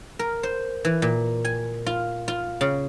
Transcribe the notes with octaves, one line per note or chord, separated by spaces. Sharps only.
A#4
C5
E3
A#2
G#5
F4
F4
C#3